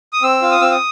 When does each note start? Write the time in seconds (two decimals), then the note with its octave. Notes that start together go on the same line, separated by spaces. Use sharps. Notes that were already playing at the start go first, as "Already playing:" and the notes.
0.13 D#6
0.22 C4 E6
0.42 F4
0.51 D#6
0.61 C4 E6
0.71 D#6